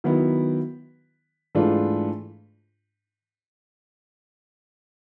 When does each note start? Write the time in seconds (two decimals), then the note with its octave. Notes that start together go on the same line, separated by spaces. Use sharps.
0.04 D#3 F#3 B3 E4
1.55 G#2 E3 A3 D4 F4